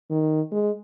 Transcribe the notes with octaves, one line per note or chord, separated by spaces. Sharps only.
D#3
G#3